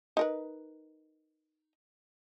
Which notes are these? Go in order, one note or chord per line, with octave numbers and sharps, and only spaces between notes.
D#4 A#4 B4